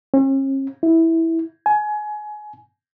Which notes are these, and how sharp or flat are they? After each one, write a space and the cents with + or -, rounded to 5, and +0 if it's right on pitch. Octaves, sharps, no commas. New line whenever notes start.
C#4 -45
E4 -10
G#5 +25